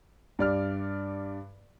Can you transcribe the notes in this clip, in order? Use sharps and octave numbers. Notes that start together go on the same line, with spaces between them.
G2 D5 F6